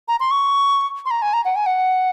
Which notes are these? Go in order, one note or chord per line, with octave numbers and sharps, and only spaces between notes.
A#5
C6
C#6
C6
A#5
G#5
A#5
F#5
G#5
F#5